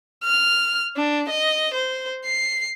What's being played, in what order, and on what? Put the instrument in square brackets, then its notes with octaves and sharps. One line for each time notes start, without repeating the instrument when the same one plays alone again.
[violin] F6
D4
D#5
C5
C7